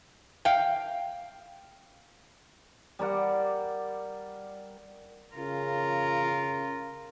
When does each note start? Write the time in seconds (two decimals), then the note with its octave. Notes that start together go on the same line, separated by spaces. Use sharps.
0.45 F5 G5
2.99 G3 A#4 D5 F#5
5.36 C#3 F4 A#4